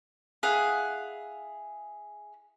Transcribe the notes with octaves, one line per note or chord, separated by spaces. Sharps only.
E4 G#4 F5 F#5